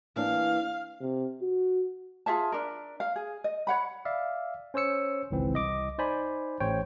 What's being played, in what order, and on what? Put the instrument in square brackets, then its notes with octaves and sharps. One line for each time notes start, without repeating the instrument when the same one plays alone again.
[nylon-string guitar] E3 A#3 D4 [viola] F5
[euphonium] C3
F#4
[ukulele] F4 G#4 E5 A5
D4 A#4
F5
G#4
D#5
C#5 F#5 B5
[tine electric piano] D5 E5 F5
C#4 C5 C#5 E6 C#7
G#1 C#2 E3 C4
C2 D#5 D6
D#4 C5 D5 G#5 B5
A1 C5 C#5 G5